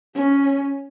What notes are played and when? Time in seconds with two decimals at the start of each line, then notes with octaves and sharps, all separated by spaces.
0.15 C#4